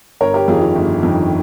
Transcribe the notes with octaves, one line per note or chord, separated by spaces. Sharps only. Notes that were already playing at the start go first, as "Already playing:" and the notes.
G1 A#4 C#5
G4 A#4
F2 D#3 F4 G#4
F4
G1
F2 D#3